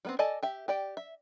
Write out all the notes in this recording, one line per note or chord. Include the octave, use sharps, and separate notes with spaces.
G3 B3 C4
A4 D5 D#5 G#5 A5
G4 E5
G4 D5 G5
E5